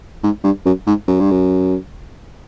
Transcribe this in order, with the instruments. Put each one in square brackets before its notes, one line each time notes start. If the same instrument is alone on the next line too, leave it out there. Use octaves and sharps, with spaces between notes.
[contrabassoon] G#2
G2
F#2
G#2
F#2
G2
F#2